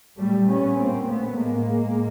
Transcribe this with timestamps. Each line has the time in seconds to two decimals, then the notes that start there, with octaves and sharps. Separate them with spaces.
0.19 A#2 G3 A3
0.49 B3 C#4
0.78 A#3 C4
1.09 A3 B3
1.38 A2 G#3 A#3